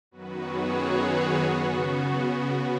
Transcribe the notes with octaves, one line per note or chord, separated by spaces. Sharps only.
F#2 D#3 F#3 B3 F#4 B4
G#4 C#5
F#4 B4
G#4
C#3 B3 F#4